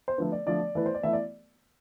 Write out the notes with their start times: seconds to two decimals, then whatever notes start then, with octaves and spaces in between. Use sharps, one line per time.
0.08 C5
0.18 D3 F3 A3 B4
0.32 D5
0.46 D3 F3 A3 D5
0.75 E3 A3 E4 B4
0.86 C5
0.95 D5
1.03 E3 A3 E4 E5
1.13 D5